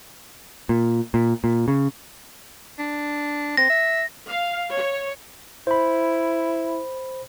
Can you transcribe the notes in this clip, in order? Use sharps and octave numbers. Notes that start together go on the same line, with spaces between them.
A#2
A#2
A#2
C#3
D4
C4 A#6
E5
F5
C#5
E4 C5 B5